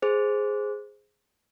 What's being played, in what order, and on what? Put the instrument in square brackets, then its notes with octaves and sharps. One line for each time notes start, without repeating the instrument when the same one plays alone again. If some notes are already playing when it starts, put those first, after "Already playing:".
[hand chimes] G#4 C5